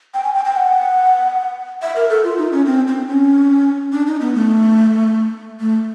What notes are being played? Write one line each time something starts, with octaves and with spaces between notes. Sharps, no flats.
G5
G#5
G5
G5
F#5
E5
A#4
A4
F4
D#4
C#4
C4
C4
C#4
D4
D#4
B3
A3
A3